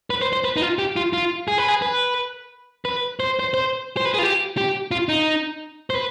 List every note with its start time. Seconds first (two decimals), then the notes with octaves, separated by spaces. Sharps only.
0.10 B4
0.22 C5
0.33 C5
0.44 B4
0.56 D#4
0.62 F4
0.79 G4
0.96 F4
1.13 F4
1.48 G#4
1.58 B4
1.68 G#4
1.82 B4
2.85 B4
3.20 C5
3.40 C5
3.54 C5
3.97 C5
4.05 B4
4.14 G#4
4.19 F4
4.23 G4
4.57 G4
4.91 F4
5.09 D#4
5.90 C5
5.95 B4